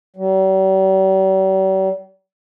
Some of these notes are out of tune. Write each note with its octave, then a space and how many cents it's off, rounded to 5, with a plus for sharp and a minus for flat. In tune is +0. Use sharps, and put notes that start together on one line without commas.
G3 -45